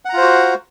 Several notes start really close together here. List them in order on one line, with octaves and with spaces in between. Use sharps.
F#5 A#5 F4 C5 F#4